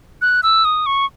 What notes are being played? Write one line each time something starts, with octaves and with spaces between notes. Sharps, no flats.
F#6
E6
D#6
C#6